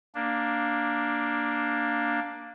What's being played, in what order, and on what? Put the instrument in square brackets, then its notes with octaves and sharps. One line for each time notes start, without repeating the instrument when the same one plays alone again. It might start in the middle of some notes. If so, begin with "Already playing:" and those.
[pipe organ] A#3 D4